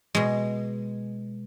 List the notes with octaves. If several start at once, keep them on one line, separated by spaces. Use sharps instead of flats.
B2 G#3